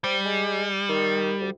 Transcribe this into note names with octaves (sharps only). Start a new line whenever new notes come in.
G3 C5
G#3
D#3
D2